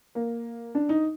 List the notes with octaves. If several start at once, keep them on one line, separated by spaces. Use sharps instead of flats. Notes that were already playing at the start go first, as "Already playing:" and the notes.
A#3
D4
D#4